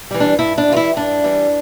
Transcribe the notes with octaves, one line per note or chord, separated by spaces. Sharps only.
E3 G3
D4
G2 E4
D4
E3 G3 F4
E4
G2 D4
E3 G3